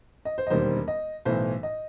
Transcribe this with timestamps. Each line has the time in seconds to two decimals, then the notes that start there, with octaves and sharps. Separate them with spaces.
0.25 D#5
0.38 C5
0.47 D#5
0.50 E1 D#2 D#3 G3 C5
0.88 D#5
1.25 B1 A2 E3 C5
1.63 D#5